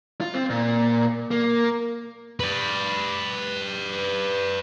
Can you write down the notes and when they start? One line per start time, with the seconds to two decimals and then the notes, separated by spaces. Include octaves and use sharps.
0.21 F4
0.34 C4
0.50 A#2
1.31 A#3
2.40 B4 D5